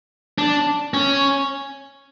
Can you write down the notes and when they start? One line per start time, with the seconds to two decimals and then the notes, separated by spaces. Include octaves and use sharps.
0.38 D4
0.94 C#4